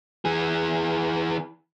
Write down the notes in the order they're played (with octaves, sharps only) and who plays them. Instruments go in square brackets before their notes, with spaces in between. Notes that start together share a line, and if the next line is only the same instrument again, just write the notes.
[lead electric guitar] E3 G#4